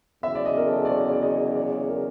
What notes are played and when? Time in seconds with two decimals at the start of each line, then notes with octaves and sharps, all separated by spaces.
0.23 E2 C#3 F#3 E5
0.35 D5
0.45 D#5
0.57 A#4
0.67 A4
0.85 D5
0.90 C#5
1.13 D5
1.22 D#5
1.55 D5
1.71 D5
1.88 A#4